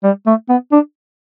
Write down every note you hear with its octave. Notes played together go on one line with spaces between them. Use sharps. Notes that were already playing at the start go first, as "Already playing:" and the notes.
G3
A3
B3
D4